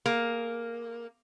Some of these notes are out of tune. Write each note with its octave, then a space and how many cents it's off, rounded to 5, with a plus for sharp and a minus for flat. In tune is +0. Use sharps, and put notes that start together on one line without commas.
A#3 +0 G#4 +30